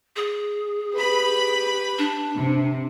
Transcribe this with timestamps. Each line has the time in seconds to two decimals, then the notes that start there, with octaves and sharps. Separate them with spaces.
0.16 G#4
0.93 G4 B4 B5
1.99 D4
2.37 C3